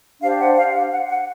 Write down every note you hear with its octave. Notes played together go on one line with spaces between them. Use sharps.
D4 G4 C5 F5
F#5
F5
F5
F#5
F#5